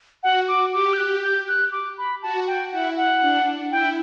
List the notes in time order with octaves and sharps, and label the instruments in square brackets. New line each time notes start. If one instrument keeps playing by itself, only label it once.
[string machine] F#4 [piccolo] F#5
[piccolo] D6
[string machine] G4 [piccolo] D6
[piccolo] G6
F#6
G6
F#6
D6
B5
[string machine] F#4 [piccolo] A5
[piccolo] G5
[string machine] E4 [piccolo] F#5
[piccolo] F#5
[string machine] D4
[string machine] E4 [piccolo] G5